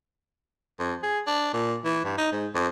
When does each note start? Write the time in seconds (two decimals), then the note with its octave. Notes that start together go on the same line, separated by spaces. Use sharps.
0.80 F2
1.03 G#4
1.27 D4
1.53 A#2
1.85 E3
2.05 G2
2.18 D#4
2.32 G#2
2.55 F2